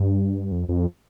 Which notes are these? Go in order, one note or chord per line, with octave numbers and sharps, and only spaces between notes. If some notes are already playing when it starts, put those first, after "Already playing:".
Already playing: G2
F2
F2